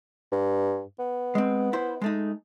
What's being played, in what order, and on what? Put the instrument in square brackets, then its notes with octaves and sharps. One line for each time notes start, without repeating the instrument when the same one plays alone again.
[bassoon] G2
B3
[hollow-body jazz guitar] G#3 C4
E4 C5
G#3 A3 D#4